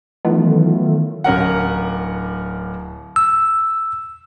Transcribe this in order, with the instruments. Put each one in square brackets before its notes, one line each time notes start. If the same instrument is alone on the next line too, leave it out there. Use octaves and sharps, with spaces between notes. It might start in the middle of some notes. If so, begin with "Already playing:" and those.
[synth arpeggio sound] D#3 E3 F#3 A3 B3 F4
[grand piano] D1 C#4 A#4 F#5
[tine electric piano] E6